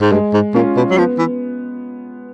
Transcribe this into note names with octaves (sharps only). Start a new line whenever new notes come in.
G#2
G2 G#3
G#2
A#2 C#4 F4
B2
F#3
F3 B3
E3